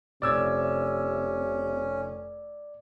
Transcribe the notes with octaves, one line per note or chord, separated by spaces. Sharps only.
F1 C3 C#4 D5 E6 G#6